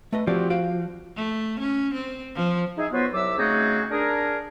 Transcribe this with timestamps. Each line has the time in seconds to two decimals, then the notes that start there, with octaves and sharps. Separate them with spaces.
0.13 A3 B4 D#5
0.27 F3 C4 F#4 G4 D5
0.50 F#4 C5 F5 D7
1.16 A3
1.59 C#4
1.94 C4
2.35 F3
2.78 D#4 G#4 E5
2.91 F#3 B3 F4 F#4 B4 C5
3.13 C2 F#3 E5 D6 E6
3.37 C#3 A3 C4 D#4 F#4 G#4
3.91 D4 G#4 A#4